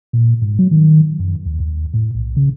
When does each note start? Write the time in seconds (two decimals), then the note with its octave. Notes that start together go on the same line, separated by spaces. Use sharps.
0.13 A#2
0.42 G#2
0.59 F#3
0.71 D#3
1.19 F#2
1.46 D#2
1.60 D#2
1.94 A2
2.15 B1
2.36 C#3